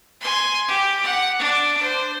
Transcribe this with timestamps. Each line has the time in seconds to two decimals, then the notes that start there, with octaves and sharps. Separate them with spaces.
0.21 G#5 C6
0.68 G4
1.04 F#5
1.39 D4
1.80 C5